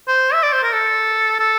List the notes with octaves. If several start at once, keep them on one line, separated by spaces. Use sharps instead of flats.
C5
E5
D5
C5
A#4
A4
A4